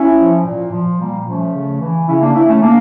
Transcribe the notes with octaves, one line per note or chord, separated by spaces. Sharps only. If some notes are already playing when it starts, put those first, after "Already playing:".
Already playing: C#4 E4
F3
A#2
F3
A#2 G3 A#3
F3 A3 C#4
C#3
E3
C#3 C#4 E4
A#3 D4
E3 C#4 E4
A3 C#4
C#3 A#3 D4